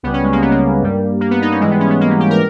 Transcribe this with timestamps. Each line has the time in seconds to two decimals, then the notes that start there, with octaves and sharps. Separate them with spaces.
0.03 C#2 C#3 G3 B3
0.13 C#4
0.23 G#3
0.32 A#3
0.42 B3
0.51 A#3
0.82 G2 G3
1.21 A#3
1.31 B3
1.42 D#4
1.51 C#4
1.60 G#2 E3 G3 G#3
1.71 B3
1.80 C#4
1.90 B3
2.01 A#3
2.10 C#4
2.20 G4
2.30 A#4